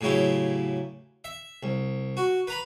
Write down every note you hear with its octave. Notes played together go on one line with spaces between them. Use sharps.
A2 C#3 F#3 E4 G4
E5
C2
F#4
B4 A#5 B5